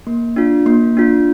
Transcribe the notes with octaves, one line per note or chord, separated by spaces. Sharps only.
A#3
D4 F4
A#3
D4 F4